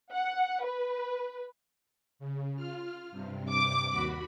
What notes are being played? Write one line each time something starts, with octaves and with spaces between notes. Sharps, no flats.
F#5
B4
C#3
F4 F6
G2 C3
D6
D#2 F#4 B5